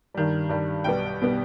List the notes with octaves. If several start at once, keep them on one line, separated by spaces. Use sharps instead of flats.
G2 D#3 G3
G2 D#3 G3
B1 B2 G3 B3 G5
B2 G3 B3